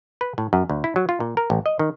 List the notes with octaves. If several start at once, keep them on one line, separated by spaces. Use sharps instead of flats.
B4
A2
F#2
D2
E4
F#3
F4
A#2
A#4
A1
D#5
D#3